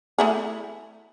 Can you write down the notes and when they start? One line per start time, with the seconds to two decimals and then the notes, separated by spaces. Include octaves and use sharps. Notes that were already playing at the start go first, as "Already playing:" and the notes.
0.18 A3 E4 G#4